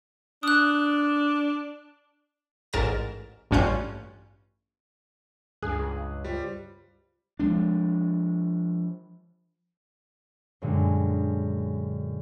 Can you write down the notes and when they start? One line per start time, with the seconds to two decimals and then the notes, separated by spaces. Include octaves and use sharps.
0.43 D4 D#6 F#6
2.73 A1 G#2 A#4 A6 E7
3.51 A1 G2 C#4 F4 F#6 G6
5.62 C#2 G2 G#4 F#6
6.24 G3 F4 C5
7.39 F3 G#3 D4
10.62 F#2 A#2 D3 G3 G#3